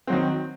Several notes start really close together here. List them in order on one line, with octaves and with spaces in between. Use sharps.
C4 F#3 D#3